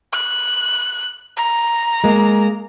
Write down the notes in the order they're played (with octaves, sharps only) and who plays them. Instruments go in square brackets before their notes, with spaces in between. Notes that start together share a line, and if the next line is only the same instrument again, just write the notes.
[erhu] F#6
A#5
[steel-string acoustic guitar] G#3 A#3